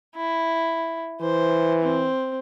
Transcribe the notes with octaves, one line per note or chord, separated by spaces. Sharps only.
E4
E3 C5
C4